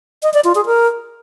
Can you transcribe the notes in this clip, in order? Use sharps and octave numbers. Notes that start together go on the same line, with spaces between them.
D#5
D5
F4
G#4
A#4